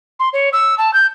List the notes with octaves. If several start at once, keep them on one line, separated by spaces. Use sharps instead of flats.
C6
C#5
E6
A5
G6